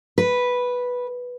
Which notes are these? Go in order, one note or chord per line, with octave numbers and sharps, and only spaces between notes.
B4